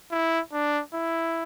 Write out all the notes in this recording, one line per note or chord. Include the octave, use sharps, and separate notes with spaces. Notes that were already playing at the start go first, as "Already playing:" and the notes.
E4
D4
E4